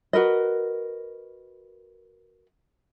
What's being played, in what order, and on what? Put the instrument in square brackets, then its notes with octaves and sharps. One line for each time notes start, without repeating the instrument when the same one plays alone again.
[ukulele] F#4 A#4 B4 D#5